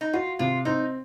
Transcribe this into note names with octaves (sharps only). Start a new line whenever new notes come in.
D#4
F4 F#4
C3 F4
C4 D#4